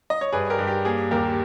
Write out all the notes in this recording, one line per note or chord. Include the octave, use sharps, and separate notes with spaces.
D#5
C#5
G2 G#4 B4
G4 A#4
G2
G4
A#3 G#4
D#2 G4 A#4